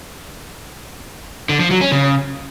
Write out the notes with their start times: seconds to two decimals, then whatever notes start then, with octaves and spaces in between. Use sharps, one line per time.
1.49 D3
1.60 F3
1.71 F#3
1.81 C#4
1.92 C#3